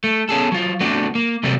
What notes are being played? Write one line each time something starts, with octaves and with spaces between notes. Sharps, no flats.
A3
B3 C#4 G#4 A4
F#3 F4
A3 B3 C4 D4 F#4
A#3
C3 F#3 G3 A3 A#3 C4